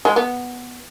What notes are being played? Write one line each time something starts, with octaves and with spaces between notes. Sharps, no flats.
G#3
B3